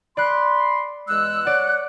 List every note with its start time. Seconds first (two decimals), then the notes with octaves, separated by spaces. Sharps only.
0.17 D5 B5 C6 F#6
1.09 E2 G#3 E6 F#6
1.47 C#5 D5 F#5